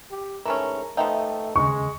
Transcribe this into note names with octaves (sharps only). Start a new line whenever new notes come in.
G4
G#2 E3 A3 C#4 A#4 A#5
F3 A3 B3 D#4 E5 G5
D#2 C#3 G#3 C#6